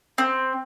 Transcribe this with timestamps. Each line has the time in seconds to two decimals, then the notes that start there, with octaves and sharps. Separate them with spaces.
0.18 C4